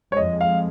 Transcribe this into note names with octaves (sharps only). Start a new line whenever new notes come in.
C#5
F2 F3 G#3 D#5
F5